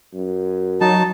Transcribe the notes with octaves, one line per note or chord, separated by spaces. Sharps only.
F#2
F#3 D#4 A5